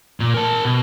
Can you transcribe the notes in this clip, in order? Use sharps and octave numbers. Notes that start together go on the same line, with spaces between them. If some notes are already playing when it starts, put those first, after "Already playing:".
A#2
A#4 A5
B2